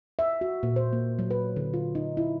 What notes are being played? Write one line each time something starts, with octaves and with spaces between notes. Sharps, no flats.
E5
F#4
A#2
C5
A#3
F#3
B4
D3
F4
D#4
E4